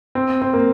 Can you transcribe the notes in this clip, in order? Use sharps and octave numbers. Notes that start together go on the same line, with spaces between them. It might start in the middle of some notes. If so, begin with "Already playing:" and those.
C4
C4
A#3